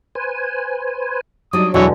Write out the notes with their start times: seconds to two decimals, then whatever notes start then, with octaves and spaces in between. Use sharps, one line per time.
0.15 B4 C5 G#5
1.53 F#3 G3 D4 D#4 D5 D#6
1.74 E2 B2 D3 E3 F#3 G#3 F#4 C#5